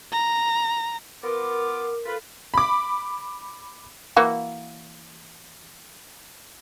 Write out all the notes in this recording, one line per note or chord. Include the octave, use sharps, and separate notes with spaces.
A#5
B3 F4 A#4 D6
F4 A4 B4
B5 D6
E3 A#3 F#4